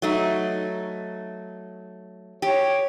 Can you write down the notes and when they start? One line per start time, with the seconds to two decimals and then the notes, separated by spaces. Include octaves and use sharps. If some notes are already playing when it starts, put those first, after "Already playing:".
0.02 F#3 A3 D#4
2.42 G4 C#5